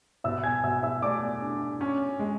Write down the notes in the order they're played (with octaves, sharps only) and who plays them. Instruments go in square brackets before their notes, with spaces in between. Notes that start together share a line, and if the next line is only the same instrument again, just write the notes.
[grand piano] B2 [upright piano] E5 E6
[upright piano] G#5 G#6
[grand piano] B2 [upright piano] E5 E6
[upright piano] E5 E6
[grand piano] A3 [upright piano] D5 D6
[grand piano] D4
C#4
G#3